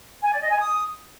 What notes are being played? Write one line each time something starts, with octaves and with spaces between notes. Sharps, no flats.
G#5
D5
D#5
G#5
D#6